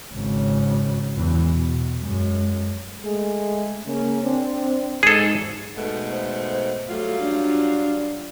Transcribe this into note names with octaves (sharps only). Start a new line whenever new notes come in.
G#1 C#3
E2 E3
B2
F#2 G#3
G#3 A3 G#4
C#3 A#3 C#4
C4 D4
G#2 G#4 A4
G#2 B2 A3
C5
F#3 G3 A3 F4
D4